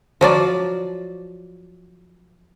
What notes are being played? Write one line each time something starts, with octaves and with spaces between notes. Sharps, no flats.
F3 F#3 D5